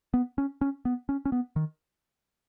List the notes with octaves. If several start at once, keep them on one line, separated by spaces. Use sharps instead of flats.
B3
C#4
C#4
B3
C#4
C#4
B3
D#3